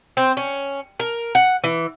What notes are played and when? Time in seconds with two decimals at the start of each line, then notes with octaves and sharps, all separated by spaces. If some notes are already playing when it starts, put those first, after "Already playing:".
0.17 C4
0.37 C#4
1.00 A#4
1.35 F#5
1.64 E3